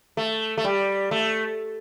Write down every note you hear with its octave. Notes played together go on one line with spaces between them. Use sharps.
A3
A3
G3
A3